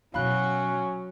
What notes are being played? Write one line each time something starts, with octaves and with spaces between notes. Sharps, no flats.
B2 F#3 C#4 E4 F#4 F5 B5 F#6